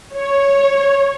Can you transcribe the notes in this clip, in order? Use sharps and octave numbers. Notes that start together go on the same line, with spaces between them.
C#5